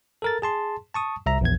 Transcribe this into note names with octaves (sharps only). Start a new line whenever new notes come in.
A4 A#4 A6
G#4 A5 C6
A5 C#6 D#6
C2 E5 A#5
A#1 E2 G#6